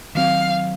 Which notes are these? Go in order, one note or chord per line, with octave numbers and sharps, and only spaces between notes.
D#3 F#3 C4 F5